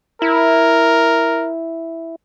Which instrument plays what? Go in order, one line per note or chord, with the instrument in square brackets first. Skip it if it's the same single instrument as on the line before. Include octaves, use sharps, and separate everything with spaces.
[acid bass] E4 [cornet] A#4